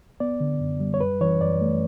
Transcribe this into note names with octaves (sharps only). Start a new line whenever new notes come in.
B3 D5
D3
F#2
G3
C#5
F#2 B4
E3 C#5
F#2 D5
A3